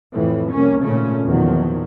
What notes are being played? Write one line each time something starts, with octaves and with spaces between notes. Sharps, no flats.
F2 A2 E3
C2 A#3 C#4
G#1 A#2 C#3 A3 C#4
E2 A#2 D#3 F3 F#3